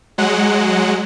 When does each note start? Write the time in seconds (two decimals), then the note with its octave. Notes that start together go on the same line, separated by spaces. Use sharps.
0.18 F#3 G#3 F#5